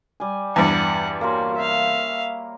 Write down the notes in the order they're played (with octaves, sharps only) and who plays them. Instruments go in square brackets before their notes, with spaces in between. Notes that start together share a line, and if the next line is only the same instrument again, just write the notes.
[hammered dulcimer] G3 G#5
[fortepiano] E2 G2 [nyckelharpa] F#5
[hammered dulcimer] A#3 C#5 C6 [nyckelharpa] F#4
[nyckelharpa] E5 F5